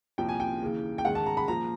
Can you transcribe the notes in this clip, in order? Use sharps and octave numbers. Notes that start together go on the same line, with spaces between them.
C2 A#2 F3 G5
G#5
G5
D#2 C#3 E3
G5
G#2 D#3 G#3 F#5
A5
A#5
B5
A#2 F3 A#3 A#5